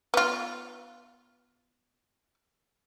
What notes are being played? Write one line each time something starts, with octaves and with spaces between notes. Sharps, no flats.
B3 F4